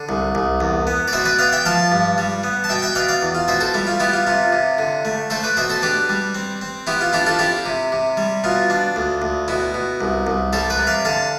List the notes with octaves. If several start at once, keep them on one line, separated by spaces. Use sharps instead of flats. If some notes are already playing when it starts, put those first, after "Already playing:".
Already playing: D3
C2
C2
E2
B3
D5
B2 C5 E5
B4 D5
B3 D5 F5
E5 G5
F3 F5 A5
G2
G3
B3
A5
B2 E5 G5
E5 G5
B2 D5 F5
D5 F5
E2
F4
B2 C5 E5
A4 C5
G3 E4
F4
B3 E4 G4
F4
C3 F4
C3
D3
A3
A3 A4 C5
B4 D5
B2 C5 E5
A4 C5
D4 G4 B4
G3
C4
C4
B3 E4 G4
F4
D4 E4 G4
F4 A4
C4 E4 G4
C3
C3
G3
B2 F4
D4
D2
D2
B2 E4
B2
C2
C2
G3 A4 C5
B4 D5
C3
D5 F5
D3 F5 A5